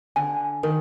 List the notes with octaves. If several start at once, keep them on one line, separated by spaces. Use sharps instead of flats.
D3 G#5
D#3 A#4